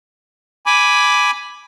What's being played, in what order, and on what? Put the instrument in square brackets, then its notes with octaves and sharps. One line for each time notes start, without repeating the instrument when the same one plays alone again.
[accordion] G#5 B5 D6